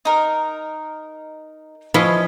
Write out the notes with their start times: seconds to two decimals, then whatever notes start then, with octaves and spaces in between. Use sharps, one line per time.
0.05 D#4 A#4
1.94 F3 C#4 E4 F4 B4 D#5